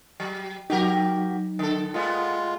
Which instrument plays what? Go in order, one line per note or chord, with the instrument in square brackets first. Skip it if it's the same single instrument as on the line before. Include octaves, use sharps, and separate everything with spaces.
[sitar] F#3
[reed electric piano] F#3 D#4 [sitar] F#4 G4 A#4
[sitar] D3 A4
[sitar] A2 B3 [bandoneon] G#3 F4